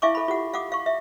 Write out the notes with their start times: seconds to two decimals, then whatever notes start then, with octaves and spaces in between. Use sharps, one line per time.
0.02 E4 E5 F5 G#5 C#6 D6
0.15 A4 B5
0.28 F4 G4 F#5
0.54 F5 F#5 D6 D#6
0.72 F5 C#6
0.86 E5